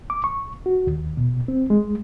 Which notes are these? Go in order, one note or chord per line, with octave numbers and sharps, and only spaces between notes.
D6
C#6
F#4
D#2
B2
C4
G#3